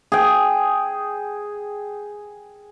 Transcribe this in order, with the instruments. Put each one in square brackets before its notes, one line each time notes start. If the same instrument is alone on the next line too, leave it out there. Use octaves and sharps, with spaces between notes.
[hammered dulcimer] G#4 G5